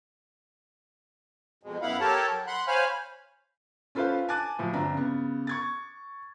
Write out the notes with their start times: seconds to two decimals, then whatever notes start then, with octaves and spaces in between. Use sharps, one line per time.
1.63 F2 B2 G#3
1.82 F#2 B3 E4 F5 F#5 B5
2.00 G4 A4 A#4 C#5 A5
2.31 F#3
2.47 F#5 B5 C6 F#6
2.68 C5 C#5 F5 G#5 B5 F6
3.95 C#4 F4 A4 B4 C5 F5
4.29 G#5 A5 D6 F#6 A6 D#7
4.59 A2 F3 F#3
4.73 G1 C4 D4 A#5
4.94 C#3 B3
5.47 C#6 G#6 A6